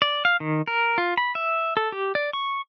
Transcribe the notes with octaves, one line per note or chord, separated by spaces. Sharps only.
D5
F5
D#3
A#4
F4
B5
E5
A4
G4
D5
C#6